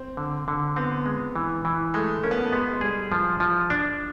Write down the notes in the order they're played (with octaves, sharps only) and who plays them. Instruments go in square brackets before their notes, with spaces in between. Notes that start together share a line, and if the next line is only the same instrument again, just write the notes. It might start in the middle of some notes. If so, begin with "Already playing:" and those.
Already playing: [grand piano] C4
[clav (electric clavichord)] D3
D3
[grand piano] B3 [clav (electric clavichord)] C4
[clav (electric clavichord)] G#3
E3
E3
[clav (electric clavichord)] G#3 [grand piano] A3
[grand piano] A#3 [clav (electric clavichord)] C#4
[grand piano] B3
A#3
A3
[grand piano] G#3 [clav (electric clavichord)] B3
[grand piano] G#3
[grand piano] G3 [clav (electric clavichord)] G#4
[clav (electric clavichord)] F3
F3
D4